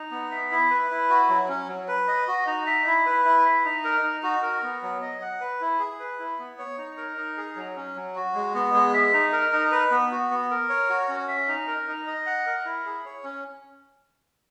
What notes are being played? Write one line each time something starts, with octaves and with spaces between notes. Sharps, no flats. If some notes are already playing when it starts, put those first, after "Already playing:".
Already playing: D#4
B3
E5
E4
B4
E4
F#4
F#3
C#4
F#3
B4
D#5
F#4
D#4
E5
E4
B4
E4
E5
D#4
A#4
D#4
F#4
A#4
B3
F#3
D#5
F#5
B4
E4
G#4
B4
E4
B3
C#5
D#4
A#4
D#4
G#4
F#3
C#4
F#3
F#4
G#3
B3
G#3
E5
D#4
A#4
D#4
B4
B3
F#4
B3
A#4
C#5
F#4
C#4
E5
D#4
A#4
D#4
D#5
F#5
A#4
E4
G#4
C#5
C#4